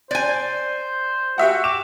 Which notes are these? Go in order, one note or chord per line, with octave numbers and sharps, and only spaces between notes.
C5 D5 G#5
F#4 G4 E5 F#5
D6 E7